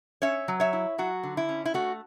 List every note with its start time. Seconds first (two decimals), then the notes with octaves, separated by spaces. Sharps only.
0.22 C#4 C#5 E5
0.48 F#3
0.60 C#5 E5
0.73 E4
0.98 F#3 F#4
1.23 D3
1.37 E4
1.49 C#4
1.65 E4
1.74 A3 F#4